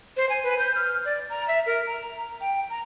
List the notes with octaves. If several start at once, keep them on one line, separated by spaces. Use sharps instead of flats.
C5
G#5
B4
G6
F6
D5
A#5
E5
A#4
A#5
G5
A#5